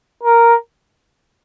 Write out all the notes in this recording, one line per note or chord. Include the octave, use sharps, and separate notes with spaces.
A#4